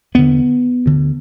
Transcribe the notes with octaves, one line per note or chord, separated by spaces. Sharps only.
E2 D3 B3
D2 D3